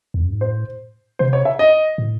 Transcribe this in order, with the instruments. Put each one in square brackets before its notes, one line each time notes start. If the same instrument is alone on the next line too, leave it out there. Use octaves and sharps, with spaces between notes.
[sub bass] E2
F#2
G#2
[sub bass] A2 [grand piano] C5
[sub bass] C3 [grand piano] C5
[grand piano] C#5
E5
D#5
[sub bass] A2